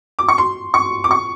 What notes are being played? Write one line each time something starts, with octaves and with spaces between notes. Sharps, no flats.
D6
C#6
C6
C#6
D6
C#6